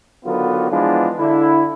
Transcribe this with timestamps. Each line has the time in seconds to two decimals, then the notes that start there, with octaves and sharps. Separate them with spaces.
0.24 D3 D#3 F#3 B3 F4 F#4
0.70 E3 F3 G#3 B3 D4 F4
1.17 D3 E4